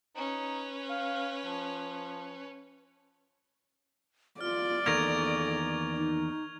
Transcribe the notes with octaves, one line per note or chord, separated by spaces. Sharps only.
C#4 D#4 B4
F5
F3
F4 D5 F6
E2 D#3 A#3 A4 C#6 G#6 F7
D#4